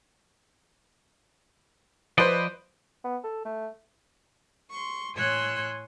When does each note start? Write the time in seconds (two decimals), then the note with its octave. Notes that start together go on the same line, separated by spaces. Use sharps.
2.18 F3 B4 C5 D5 D#5
3.04 B3
3.24 A4
3.45 A3
4.70 C6 C#6
5.16 A2 C#5 G#5 C6 E6 F#6